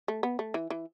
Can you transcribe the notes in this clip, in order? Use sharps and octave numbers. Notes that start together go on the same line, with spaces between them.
A3
B3
A3
E3
E3